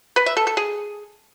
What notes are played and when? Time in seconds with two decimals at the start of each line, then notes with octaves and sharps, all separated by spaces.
0.16 B4
0.26 E5
0.37 A4
0.47 A4
0.57 G#4